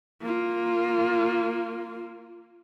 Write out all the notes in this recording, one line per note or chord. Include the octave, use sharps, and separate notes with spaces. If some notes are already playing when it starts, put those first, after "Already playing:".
A#3 F4